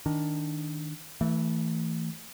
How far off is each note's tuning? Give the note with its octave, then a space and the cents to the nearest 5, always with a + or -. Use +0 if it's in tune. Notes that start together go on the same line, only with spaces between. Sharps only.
D#3 +5 D4 +0
E3 -15 A3 +25